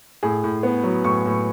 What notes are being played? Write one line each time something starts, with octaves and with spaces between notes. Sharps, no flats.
A2 G#4
A2
B3
F#3
A2 C#6
A2